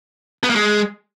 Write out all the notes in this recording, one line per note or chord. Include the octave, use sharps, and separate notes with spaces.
B3
A#3
G#3